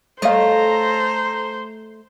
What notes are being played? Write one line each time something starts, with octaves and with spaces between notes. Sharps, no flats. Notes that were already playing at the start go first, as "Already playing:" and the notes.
A3 A4 C5 C#5 D#5 F5 A#5